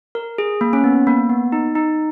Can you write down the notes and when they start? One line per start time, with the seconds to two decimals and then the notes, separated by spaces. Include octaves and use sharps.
0.15 A#4
0.38 G#4
0.61 A#3
0.73 C#4
0.84 B3
1.07 A#3
1.30 B3
1.52 D#4
1.75 D#4